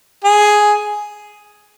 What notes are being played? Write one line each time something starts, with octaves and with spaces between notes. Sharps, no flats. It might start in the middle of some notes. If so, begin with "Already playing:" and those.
G#4